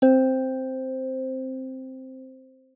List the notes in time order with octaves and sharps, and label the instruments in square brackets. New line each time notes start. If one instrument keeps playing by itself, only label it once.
[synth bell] C4 C5